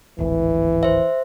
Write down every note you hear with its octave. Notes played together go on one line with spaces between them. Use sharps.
D1 G#1 E3
C5 E5